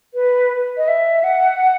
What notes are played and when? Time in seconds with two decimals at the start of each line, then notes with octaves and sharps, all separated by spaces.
0.14 B4
0.77 D#5
0.88 E5
1.24 F#5